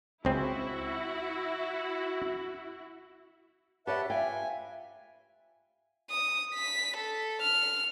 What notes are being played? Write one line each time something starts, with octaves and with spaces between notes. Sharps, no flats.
C#2 C4 E4 F#4 G#4
G4 B4 C#5 D#5 E5 F#5 A5
F4 F5 G5 G#5
D#6
B6
A4
F6